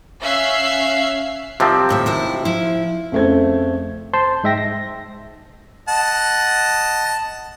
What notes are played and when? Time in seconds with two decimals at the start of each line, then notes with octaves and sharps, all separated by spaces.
0.21 C#4 E5 F5 E6 F#6 C7
1.60 C3 D#3 F3 G3 C4
1.89 D#2 A2 E5
2.06 D#3 E4 F#4
2.45 F3 E4
3.12 F2 C#3 A3 C4 G#6
4.14 C5 A5 C6
4.44 G#2 G#3 E5 G5 A#6
4.58 A#6
5.88 D#5 F#5 A5